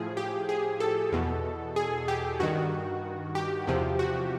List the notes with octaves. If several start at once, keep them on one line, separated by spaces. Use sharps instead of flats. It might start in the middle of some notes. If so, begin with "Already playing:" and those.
Already playing: A2 F3 G#4
G4
G#4
A4
E2 B2
G#4
G4
G2 D#3 F#4
G4
E2 C3 F3
F#4